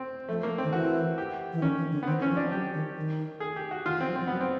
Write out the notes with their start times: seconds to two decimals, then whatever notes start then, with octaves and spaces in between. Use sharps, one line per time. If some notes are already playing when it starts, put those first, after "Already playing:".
Already playing: C4
0.28 F3 A3
0.43 A#3
0.58 C4
0.63 D#3
0.73 E3 F#4
1.18 G4
1.53 E3
1.62 D#3 C#4
1.78 E3
1.92 D3
2.03 B3
2.07 D#3 C4
2.22 E3 C#4
2.30 F3
2.37 D4
2.52 F#3 G4
2.74 D#3
2.96 D#3
3.40 G#4
3.56 G4
3.71 F#4
3.86 D#3 F4
3.97 E3
4.01 C4
4.08 F#3
4.16 F3 C4
4.28 F#3 B3
4.41 C4